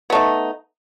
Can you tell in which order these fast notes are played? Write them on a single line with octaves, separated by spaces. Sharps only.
B3 A3 D#4